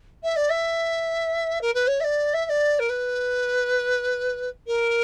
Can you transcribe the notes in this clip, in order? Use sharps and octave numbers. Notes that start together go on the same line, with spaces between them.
E5
D5
E5
A#4
B4
C#5
E5
D5
E5
E5
D5
A#4
B4
A#4